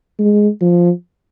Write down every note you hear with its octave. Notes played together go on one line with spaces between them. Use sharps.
G#3
F3